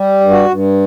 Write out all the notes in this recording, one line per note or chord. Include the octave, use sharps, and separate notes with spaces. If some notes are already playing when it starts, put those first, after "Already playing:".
Already playing: G3
G2
F#4
G2